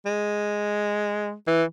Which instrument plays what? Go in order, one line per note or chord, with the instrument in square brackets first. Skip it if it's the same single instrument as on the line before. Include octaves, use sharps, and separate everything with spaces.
[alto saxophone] G#3
E3